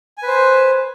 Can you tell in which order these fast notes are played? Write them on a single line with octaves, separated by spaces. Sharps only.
G#5 B4 C5